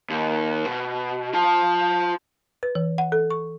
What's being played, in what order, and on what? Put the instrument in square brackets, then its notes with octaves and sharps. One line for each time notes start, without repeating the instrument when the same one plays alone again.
[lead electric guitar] D#2
B2
F4 A5
[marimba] B4
E3
F#5
A4
C#6